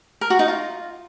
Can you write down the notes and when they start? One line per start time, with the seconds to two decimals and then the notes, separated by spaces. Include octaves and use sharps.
0.21 A#4
0.30 F#4
0.39 D#4
0.48 F4